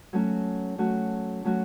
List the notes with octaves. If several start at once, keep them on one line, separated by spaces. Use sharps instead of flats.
F#3 A3 C#4 F#4
F#3 A3 C#4 F#4
F#3 A3 C#4 F#4